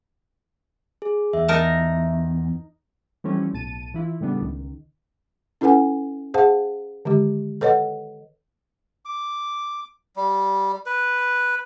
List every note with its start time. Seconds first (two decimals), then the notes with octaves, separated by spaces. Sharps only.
1.02 G#4
1.33 E2 E5
1.48 D#4 A#4 A5
3.24 E3 F3 G3 A3 C4 C#4
3.53 B1 A2 A5 D#7
3.94 E3 E4 F4
4.20 A2 C#3 G3 B3 D4
4.41 C#2 D#3
5.61 C#4 E4 A4 B4 F#5 G#5
6.34 G#4 C5 F5 F#5 A5
7.05 D3 D#3 G#3 G4
7.61 A4 B4 C#5 D#5 F#5
9.05 D6
10.16 G3
10.86 B4